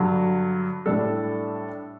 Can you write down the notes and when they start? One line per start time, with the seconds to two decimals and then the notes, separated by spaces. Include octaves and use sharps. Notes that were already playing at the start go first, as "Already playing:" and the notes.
Already playing: G2 D3 F#3
0.86 A2 G3 D4 A4